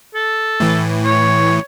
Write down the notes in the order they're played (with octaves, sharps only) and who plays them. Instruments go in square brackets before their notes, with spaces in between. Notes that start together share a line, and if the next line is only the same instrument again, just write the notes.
[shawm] A4
[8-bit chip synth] A2 E3
[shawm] C#5